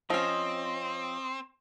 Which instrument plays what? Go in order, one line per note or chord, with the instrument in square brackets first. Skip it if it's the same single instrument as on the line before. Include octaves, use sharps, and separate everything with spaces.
[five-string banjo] F3 C#4 [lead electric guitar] C4 [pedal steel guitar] D#5